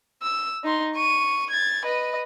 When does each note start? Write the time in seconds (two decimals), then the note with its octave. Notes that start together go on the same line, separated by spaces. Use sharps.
0.22 E6
0.64 D#4 C6
0.95 C#6 D#7
1.50 G#6 A6
1.85 B4 D#5